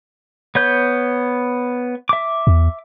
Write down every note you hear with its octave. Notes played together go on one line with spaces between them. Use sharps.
B3 C#5 G6
E5 D6
E2